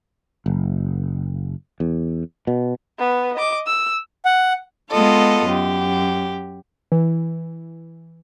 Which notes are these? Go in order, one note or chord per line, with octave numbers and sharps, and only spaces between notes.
F#1
E2
B2
B3 B4
D#5 D6
E6
F#5
G#3 B3 F4 A4 D#5
F#2 G4
E3